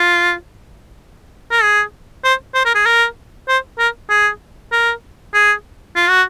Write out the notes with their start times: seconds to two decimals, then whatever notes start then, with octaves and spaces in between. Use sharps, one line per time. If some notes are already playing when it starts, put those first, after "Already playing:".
Already playing: F4
1.51 A#4
1.62 G#4
2.24 C5
2.54 C5
2.65 A#4
2.75 G#4
2.85 A#4
3.48 C5
3.79 A#4
4.09 G#4
4.72 A#4
5.34 G#4
5.96 F4
6.09 F#4